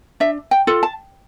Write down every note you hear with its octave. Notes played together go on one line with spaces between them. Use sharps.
D4 E5
G5
F4 A4
A5